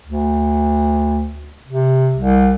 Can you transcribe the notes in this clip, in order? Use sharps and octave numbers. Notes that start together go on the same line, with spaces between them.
D2
C3
C2